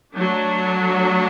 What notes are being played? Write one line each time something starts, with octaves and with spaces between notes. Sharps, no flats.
F#3 A3 D4